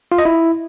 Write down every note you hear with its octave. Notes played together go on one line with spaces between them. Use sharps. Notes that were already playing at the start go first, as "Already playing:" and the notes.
F4
D#5
E4